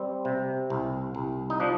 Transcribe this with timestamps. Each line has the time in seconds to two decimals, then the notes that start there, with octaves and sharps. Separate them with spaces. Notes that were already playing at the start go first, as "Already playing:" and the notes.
Already playing: G3 C4
0.25 C3
0.70 C2
1.15 C2
1.50 D#4
1.60 F3 D4